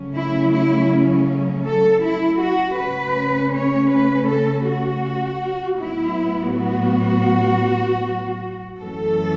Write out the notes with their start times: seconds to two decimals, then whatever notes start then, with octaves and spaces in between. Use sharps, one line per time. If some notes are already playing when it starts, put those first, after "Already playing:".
Already playing: C#3 F#3 A3 C#4
0.15 E4
0.53 E4
1.65 A4
2.03 E4
2.40 F#4
2.78 C#3 A3 C#4 B4
3.54 C#5
3.90 B4
4.28 A4
4.66 F#4
5.78 A2 F#3 B3 E4
6.53 F#4
8.80 F#2 E3 A3 C#4 A4